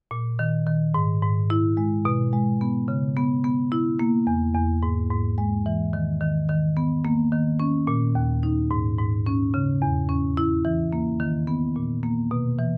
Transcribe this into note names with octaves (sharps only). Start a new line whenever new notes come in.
A#2
D#3
D#3
G#2
G#2
E4
G#3
B2
G#3
B3
C#3
B3
B3
E4
A#3
E2
E2
G#2
G#2
G#3
E3
D#3
D#3
D#3
B3
A#3
D#3
C#4
A#2
D#2
D#4
G#2
G#2
C#4
C#3
E2
C#4
E4
E3
A#3
D#3
B3
A#2
A#3
B2
E3